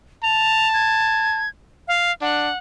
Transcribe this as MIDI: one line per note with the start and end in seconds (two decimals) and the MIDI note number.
0.24 1.45 81
0.24 0.68 101
0.74 1.49 92
1.88 2.12 77
2.22 2.51 62
2.22 2.58 78